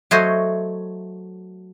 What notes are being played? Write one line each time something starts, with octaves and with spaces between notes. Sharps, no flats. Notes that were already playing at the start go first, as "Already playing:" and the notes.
F#3 A3 C5 C#5 D#5